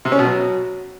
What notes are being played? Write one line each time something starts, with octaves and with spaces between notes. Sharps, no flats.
C3
C#4
B2
F#3